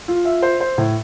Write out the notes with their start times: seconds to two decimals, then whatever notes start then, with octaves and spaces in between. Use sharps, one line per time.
0.08 F4
0.25 E5
0.42 C5
0.60 C5
0.78 A2